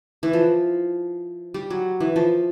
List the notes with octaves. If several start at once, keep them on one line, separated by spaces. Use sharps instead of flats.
E3
F3
G3
F#3
E3
F3